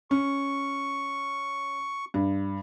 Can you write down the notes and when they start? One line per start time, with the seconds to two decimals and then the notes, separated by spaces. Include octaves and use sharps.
0.11 C#4 C#6
2.14 G2